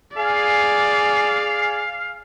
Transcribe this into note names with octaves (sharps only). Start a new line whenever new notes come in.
G#4 D5 F5 G#5